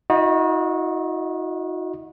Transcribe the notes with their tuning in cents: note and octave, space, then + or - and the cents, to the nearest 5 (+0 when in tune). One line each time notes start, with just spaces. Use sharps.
D#4 +45 F#4 -30 D#5 -20